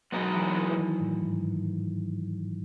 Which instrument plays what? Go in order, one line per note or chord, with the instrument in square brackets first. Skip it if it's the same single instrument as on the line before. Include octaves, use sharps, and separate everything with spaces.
[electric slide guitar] E2 B2 G#3 B3 D#4 [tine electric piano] F#3
[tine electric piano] E3
E3
E3
D#3
A2
G#2